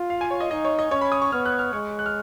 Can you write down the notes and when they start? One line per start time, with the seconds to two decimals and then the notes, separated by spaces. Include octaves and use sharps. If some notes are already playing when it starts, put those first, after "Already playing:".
Already playing: F4
0.10 F5
0.21 G#5
0.31 C#5
0.40 D#5
0.51 D#4 D#5
0.65 C#5
0.79 D#5
0.91 C#4 C#5
1.01 B5
1.12 D#6
1.22 C#6
1.32 B3 F6
1.46 F#6
1.59 F6
1.73 G#3 C#6
1.99 F#6
2.06 F6